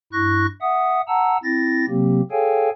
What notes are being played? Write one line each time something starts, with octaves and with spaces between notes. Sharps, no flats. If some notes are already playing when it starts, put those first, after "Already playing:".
G2 E4 C#6 F#6 A#6
E5 F#5 D#6
F#5 A5 A#5 E6
C4 E4 A6 A#6
C3 F#3 A#3 C4 G4
G#4 A4 C#5 F5 G5 G#5